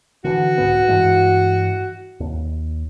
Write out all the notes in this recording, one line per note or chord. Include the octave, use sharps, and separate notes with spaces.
D3 E3 F#4
C2 G#2 B3
G2 E3 G#3
D#2